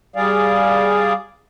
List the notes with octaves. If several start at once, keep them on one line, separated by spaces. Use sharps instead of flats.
G3 G#4 D5 F5